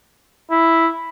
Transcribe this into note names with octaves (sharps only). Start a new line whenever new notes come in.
E4